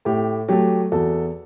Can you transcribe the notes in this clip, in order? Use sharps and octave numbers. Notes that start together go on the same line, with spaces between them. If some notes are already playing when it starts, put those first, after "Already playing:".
A2 G4
F#3 A3 G4
E2 F#4 A4